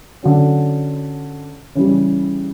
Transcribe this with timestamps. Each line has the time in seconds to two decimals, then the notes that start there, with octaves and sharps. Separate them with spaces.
0.23 D3 F#3 C#4
1.75 C#3 E3 G3